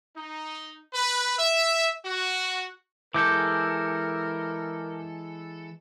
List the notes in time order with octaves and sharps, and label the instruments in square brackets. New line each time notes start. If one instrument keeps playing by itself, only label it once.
[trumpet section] D#4
B4
E5
F#4
[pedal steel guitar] E3 G#3 A4 [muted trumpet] A#4 [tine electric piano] D6 G6